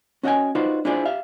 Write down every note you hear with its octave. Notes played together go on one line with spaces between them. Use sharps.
C#4 F#4 D#5 E5 G5 G#5
D#4 F4 F#4 B4 C5 D5
D4 E4 F4 G#4 C5 D5
G4 E5 F5